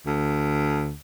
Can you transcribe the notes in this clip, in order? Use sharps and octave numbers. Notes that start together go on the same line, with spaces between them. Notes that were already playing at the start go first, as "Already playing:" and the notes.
D2